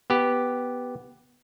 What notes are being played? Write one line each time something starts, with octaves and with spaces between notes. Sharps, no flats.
B3 G4